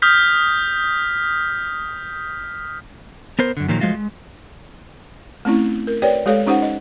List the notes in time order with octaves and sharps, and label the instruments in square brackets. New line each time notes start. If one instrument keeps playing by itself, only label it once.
[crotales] D#6 F6 G6 B6
[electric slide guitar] B3 A#4 C5
F#2 D3
A#2 D#3 F3 F#3
F3 G#3 A3 F4 F#4
G#3
[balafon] A3 C4 C#4 E4
A#4
G4 B4 C#5 D5 G5
G#3 G4 A4 C#5 F5
C#4 D#4 G4 C5 F#5
D#5